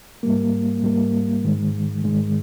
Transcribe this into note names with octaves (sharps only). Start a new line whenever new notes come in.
G#2 G3 A#3
G#2 G3 A#3
G#2 D#3 G#3
G#2 D#3 G#3